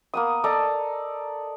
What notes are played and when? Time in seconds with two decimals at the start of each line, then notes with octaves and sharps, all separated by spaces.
0.14 A#3 B3 D#6
0.44 A4 D5 D#5 A#5